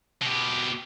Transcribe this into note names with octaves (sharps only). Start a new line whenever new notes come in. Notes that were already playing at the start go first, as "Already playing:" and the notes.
B2 G4